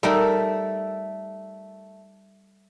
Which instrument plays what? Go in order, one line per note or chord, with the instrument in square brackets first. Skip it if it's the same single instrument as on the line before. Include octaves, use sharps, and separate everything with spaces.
[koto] G3 D#4 A#4 [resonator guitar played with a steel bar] A3